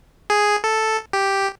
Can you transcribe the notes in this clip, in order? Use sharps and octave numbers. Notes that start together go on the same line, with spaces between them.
G#4
A4
G4